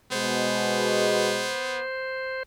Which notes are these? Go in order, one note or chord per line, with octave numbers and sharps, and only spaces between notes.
B2 G#3 B3 C5